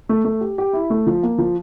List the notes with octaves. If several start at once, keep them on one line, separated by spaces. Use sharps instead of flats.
A3
A3
G4
G4
E4
A3
F3
A#3
F3